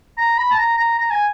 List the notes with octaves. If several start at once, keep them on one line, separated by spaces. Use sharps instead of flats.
A#5
B5
A5
A#5
A#5
A#5
G#5